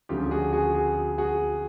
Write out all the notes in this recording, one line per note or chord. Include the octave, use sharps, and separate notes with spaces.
D2 C#3 F3 F4 G4
F#4 G#4
F#4 G#4
F#4 G#4
F#4 G#4